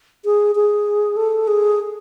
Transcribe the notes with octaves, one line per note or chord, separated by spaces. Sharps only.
G#4
G#4
A4
G#4